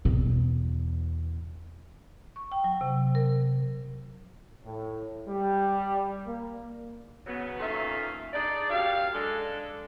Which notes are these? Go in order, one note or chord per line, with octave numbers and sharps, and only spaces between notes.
E2 B2
C#6
G5
F#3
C3
A#4
A2
G3
A#3
C#3 F#3 B3
A#2 D#3 C#4 A4 E5 F5
D4 D#4 G#4 D5
F#2 F#3 G4 F5
G#3 D4 A4